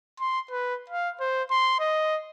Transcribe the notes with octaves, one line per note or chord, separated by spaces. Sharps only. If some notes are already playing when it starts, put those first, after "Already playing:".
C6
B4
F5
C5
C6
D#5